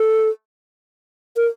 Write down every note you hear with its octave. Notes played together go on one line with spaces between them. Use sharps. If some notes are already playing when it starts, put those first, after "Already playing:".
Already playing: A4
A#4